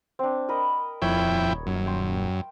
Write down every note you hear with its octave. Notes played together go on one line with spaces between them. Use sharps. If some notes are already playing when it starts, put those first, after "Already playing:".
C4 D4
A#4 D#5 B5
D#1 F2 E4 C#5 G5
F#2 E5 C#6
G5 C6